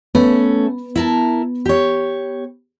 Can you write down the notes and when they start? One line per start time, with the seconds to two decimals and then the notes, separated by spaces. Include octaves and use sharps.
0.15 A3 B3 C#4
0.96 E4 A#4 A5
1.66 G4 C#5